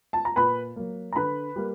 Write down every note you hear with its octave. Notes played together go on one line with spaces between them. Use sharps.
A5
A#5
A#2 B4 B5
F#3 A#3
A#5
D3 B4 B5
G3 A#3